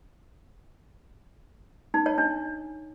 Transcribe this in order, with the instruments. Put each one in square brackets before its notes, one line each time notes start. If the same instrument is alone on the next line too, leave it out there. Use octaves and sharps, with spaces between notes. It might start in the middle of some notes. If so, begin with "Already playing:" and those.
[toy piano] D#4
C#5
D4